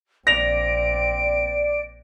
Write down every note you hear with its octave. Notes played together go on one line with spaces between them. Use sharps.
A#1 C4 D5 A#6 D7 F7